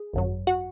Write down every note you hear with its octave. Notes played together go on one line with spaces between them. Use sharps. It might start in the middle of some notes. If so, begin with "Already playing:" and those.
Already playing: G#4
G#1 F#2 F#3
F#4 F#5